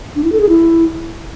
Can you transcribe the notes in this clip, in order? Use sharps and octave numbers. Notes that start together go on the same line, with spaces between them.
D4
E4
A4
G#4
E4